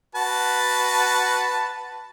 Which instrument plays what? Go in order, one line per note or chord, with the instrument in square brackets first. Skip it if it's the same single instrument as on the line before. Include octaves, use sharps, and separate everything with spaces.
[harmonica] F#4 B4 A5